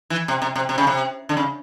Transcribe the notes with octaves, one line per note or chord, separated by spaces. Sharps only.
E3
C3
C3
C3
C3
C#3
C3
D3
C#3